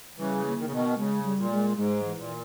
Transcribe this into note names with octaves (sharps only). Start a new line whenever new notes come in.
C#3 E3 G3
A#3
D#3
C#3
B2 D#3 B3
C#3 G#3
G3
A#2
G#3
G#2 G#3
E3
A#2